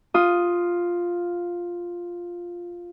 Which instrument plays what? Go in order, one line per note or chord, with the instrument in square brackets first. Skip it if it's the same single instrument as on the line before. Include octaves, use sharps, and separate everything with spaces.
[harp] F4 D#6